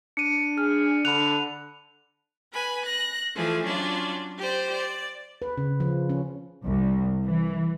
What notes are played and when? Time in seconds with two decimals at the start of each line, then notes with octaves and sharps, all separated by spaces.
0.17 D4 C#7 D#7
0.58 G#4 F6
1.05 D3 B5 F#6 F7
2.52 B4 G#5 B5
2.85 F#6 A#6
3.35 E3 F3 A3 G#4
3.64 F#3 C#4 D4 F4
4.38 G4 C5 D5
4.75 D5
5.42 B4
5.58 C#3
5.80 F3
6.10 C#4
6.65 C2
7.24 E3